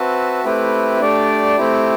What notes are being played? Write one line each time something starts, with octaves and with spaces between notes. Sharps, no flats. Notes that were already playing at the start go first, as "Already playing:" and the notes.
Already playing: C4 F#4 B4 E5 A5
A3 C4 E4 G4 B4
A3 D4 G4 D5
A3 C4 E4 G4